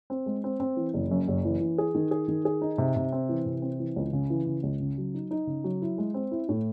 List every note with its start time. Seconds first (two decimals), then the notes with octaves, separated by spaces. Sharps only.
0.10 C4
0.26 G#3
0.44 C4
0.60 C4
0.76 E3
0.94 F#1
1.11 F#2
1.28 F#1
1.45 E3
1.60 E3
1.78 G#4
1.95 D#3
2.11 G#4
2.28 D#3
2.45 G#4
2.62 D#4
2.78 C3
2.96 C3
3.12 C4
3.29 E3
3.46 C3
3.62 C4
3.79 E3
3.96 C#2
4.13 C#3
4.30 E3
4.46 C#3
4.63 C#2
4.80 C#3
4.98 F#3
5.14 D#4
5.31 D#4
5.47 C#3
5.64 F#3
5.82 E4
5.98 G#3
6.14 C4
6.31 E4
6.49 A2